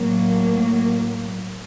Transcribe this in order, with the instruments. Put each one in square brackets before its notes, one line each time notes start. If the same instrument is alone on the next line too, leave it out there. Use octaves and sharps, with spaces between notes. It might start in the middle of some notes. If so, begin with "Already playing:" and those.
Already playing: [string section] A2 F#3 A#3